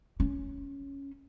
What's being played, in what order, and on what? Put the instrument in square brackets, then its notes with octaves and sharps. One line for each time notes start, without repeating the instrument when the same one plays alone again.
[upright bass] C#4